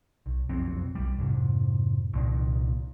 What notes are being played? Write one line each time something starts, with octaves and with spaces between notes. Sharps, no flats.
B1
F#1 B1 F2 C4
B1 G3
F2 G#2 C3
C2 A#2 D#3